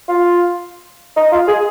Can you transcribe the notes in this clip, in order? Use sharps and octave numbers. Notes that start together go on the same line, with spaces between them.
F4
D#4
F4
G#4